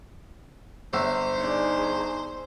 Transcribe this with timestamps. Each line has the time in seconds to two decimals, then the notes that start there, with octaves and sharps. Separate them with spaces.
0.93 G1 C5 E5 E6
1.40 D4 D#4 G#4 C#5